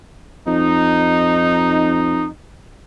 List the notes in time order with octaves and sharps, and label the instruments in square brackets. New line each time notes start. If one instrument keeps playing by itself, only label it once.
[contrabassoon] F2 [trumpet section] D#4